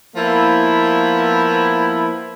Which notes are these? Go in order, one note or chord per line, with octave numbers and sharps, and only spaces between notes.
F3 A#3 B3 E4